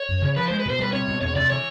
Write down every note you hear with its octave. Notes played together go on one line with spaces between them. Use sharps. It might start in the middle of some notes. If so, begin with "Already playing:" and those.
Already playing: C#5
F#2
C#3
F3 B4
G#3 C5
B4
B2 C5
G3 B4
C4 C#5
B2
E2 C#5
C3 D5
E3 C#5